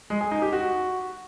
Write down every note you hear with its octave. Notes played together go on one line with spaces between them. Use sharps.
G#3
G#4
D#4
G4
F#4